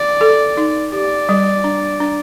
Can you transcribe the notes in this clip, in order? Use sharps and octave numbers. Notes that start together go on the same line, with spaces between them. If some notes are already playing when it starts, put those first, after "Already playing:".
Already playing: D5
A4
D#4
G4 D5
G3
D4
D4